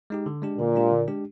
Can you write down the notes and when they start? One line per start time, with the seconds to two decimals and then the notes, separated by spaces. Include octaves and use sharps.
0.10 G#3 D#4 G4
0.26 D3
0.42 G#3 D4 G4
0.58 A#2 D3
0.75 G#3 D4 G4
0.91 D3
1.07 G#3 D4 G4